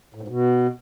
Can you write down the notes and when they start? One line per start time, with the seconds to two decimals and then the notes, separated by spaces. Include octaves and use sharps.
0.15 A2
0.21 G#2
0.28 B2